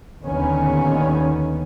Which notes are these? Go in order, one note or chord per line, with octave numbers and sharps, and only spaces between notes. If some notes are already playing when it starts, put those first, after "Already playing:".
D#2 D3 D#3 B3 C#4